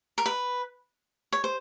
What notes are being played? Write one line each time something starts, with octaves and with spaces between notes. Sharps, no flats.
A#4
B4
C#5
C5